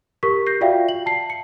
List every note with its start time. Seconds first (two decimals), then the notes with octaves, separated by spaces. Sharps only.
0.23 G4 A#4 C#6 B6
0.46 G6 A#6 C7
0.61 F4 F#4 D5 E5 F5 G5
0.89 F#7
1.06 A5 C7
1.30 C#7